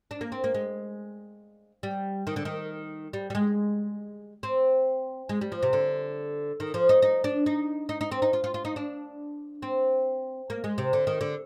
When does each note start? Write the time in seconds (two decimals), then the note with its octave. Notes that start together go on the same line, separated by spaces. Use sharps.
0.11 D4
0.21 A#3
0.32 C4
0.44 A#3
0.54 G#3
1.83 G3
2.27 D#3
2.36 D3
2.45 D#3
3.13 G3
3.30 G3
3.35 G#3
4.43 C4
5.29 G#3
5.41 G3
5.52 F3
5.63 C3
5.73 D3
6.60 D#3
6.74 F3
6.89 D#4
7.02 D#4
7.24 D4
7.46 D#4
7.89 D#4
8.01 D#4
8.11 C4
8.22 D#4
8.33 F4
8.44 F4
8.54 F4
8.65 D#4
8.76 D4
9.62 C4
10.50 A#3
10.64 G#3
10.78 C3
10.93 D3
11.07 D#3
11.21 D3